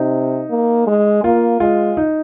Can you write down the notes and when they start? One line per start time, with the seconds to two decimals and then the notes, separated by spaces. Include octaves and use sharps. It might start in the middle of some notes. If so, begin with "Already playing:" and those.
Already playing: C3 D#4
0.50 A#3
0.87 G#3
1.24 A#3 F4
1.60 G#3 F4
1.97 D#4